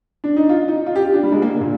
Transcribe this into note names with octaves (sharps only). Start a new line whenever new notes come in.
D4
D#4
F4
D#4
F4
G4
F4
D4
G3
G#3
A#3
D3
A#2